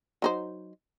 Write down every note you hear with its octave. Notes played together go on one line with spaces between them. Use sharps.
F#3 D#4 C5